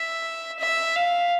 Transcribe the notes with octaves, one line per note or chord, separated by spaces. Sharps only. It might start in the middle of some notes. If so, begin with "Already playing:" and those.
Already playing: E5
E5
F5